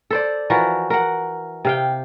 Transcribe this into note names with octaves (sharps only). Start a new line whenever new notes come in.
A4 C5 D5
E3 F3 F#4 A#4
A#4 F#5
C3 F5 G5